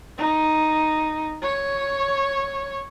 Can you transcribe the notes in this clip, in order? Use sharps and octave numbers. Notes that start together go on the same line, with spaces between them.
D#4
C#5